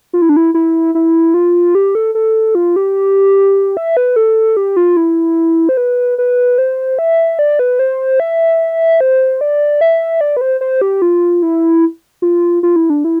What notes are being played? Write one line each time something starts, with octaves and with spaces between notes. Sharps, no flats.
F4
E4
D4
E4
E4
E4
F4
G4
A4
A4
F4
G4
E5
B4
A4
G4
F4
E4
C5
B4
B4
C5
E5
D5
B4
C5
E5
C5
D5
E5
D5
B4
C5
C5
G4
F4
E4
F4
F4
E4
D4
E4